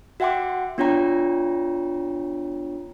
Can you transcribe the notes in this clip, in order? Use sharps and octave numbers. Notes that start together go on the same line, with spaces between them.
F#4 E5 F#5 G5 C6 D6
B3 D4 F4 C#5 G5 A#5